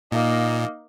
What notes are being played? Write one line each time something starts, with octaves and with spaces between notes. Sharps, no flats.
A#2 A#3 D#4